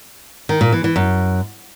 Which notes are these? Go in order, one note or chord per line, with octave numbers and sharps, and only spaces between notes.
D#3
A#2
E3
E3
F#2